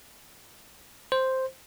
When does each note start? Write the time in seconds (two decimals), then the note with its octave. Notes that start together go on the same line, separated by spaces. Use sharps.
1.12 C5